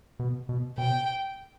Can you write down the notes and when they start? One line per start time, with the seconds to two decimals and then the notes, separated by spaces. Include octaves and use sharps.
0.19 B2
0.49 B2
0.78 B2 G5